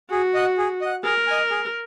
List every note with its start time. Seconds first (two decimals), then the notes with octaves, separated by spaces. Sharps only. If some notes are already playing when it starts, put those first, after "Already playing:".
0.10 F#4 G#4
0.34 D#5 F#5
0.58 G#4
0.81 D#5 F#5
1.04 G#4 A#4
1.27 D#5 G#5
1.50 G#4